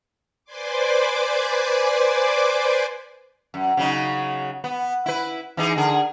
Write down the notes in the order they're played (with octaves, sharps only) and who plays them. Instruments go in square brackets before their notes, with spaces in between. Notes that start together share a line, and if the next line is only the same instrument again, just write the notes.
[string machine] B4 C5 D5 G#5 C6 D6
[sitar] F#2
C#3 F#3 D#4
B3
E4 B4
E3 D#4 G#4
D3 G#4 A#4